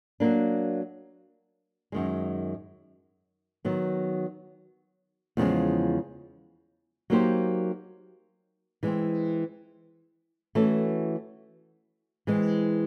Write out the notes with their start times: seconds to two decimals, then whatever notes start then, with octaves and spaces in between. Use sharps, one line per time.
0.20 F#3 A#3 D4
1.92 F#2 D#3 G#3
3.65 D#3 F#3 B3
5.37 E2 C#3 F3 G#3
7.10 F#3 A#3 D#4 G4 C5
8.83 E3 G#3 C4
10.55 E3 A3 C#4 F#4 A4
12.27 E3 G#3 C4